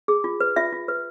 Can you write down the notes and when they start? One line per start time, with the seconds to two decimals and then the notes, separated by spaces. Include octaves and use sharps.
0.08 G#4
0.24 F4
0.40 B4
0.56 F4 E5
0.72 F4
0.88 B4